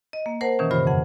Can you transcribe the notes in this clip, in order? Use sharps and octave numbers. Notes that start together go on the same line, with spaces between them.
D#5
A#3
A#4 C5 F#5 A5
B2 D#3 E3 C#4
G2 C#3 F4 C5 B5
F2 F#5